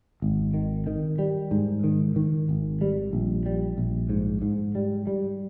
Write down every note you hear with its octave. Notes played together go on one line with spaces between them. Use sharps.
G#1
D#3
D#3
G3
G#2
D#3
D#3
G#1
G3
A#1
G3
A#1
G#2
G#2
G3
G3